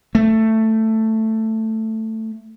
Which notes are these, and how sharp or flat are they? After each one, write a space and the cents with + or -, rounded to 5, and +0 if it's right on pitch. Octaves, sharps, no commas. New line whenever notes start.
A3 +10